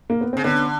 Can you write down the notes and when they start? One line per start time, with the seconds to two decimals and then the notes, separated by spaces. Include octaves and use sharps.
0.10 A#3
0.21 B3
0.33 C#3 C4
0.44 D3 B3 C#4